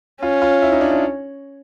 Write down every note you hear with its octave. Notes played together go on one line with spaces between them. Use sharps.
C#4 F4
F4
E4
D#4
D4
D4